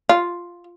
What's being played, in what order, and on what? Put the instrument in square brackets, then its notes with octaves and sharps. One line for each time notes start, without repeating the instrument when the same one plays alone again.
[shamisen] F4